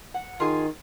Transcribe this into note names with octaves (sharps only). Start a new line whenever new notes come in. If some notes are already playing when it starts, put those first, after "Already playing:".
F#5
D#3 F4 G#4